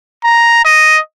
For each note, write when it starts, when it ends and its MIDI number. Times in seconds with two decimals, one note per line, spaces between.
0.24 0.61 82
0.65 0.99 75